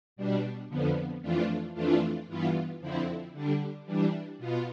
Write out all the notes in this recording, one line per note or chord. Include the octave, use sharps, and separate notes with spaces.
B2 G3 D4
F2 D3 F3 B3
F2 E3 A3 D4 F4
F2 E3 A3 D4 F4
G2 E3 B3 F4
F2 D3 F3 C4 E4
D3 G3 D4
E3 G3 D4
B2 B3 F4